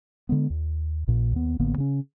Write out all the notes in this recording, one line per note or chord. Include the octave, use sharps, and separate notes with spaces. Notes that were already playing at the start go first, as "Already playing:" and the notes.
D3 G#3 B3
D#2
A#1 A#2
D#2 B3
A1 D3 A#3 B3
C#3 C#4